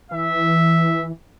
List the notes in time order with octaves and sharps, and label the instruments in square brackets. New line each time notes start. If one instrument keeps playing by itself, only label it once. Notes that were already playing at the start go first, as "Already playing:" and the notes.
[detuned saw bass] E3 [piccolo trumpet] E5